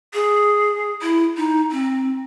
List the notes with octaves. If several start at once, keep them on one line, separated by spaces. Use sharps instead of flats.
G#4
E4
D#4
C4